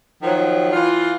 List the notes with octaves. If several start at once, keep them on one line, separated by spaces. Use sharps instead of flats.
D#3 F3 F#3
E3 F4